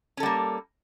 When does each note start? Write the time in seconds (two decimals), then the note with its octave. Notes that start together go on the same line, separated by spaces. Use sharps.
0.17 C#4
0.20 A4
0.23 G3
0.26 A#3